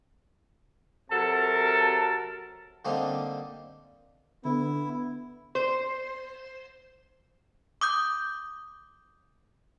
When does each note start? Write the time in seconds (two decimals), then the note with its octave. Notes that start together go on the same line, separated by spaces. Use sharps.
1.10 C3 F#3 A4 A#4 A5
2.85 D3 G3 A#3 C4 D4 D#4
4.45 D3 B3 E4
5.55 C5
7.81 D6 D#6 G6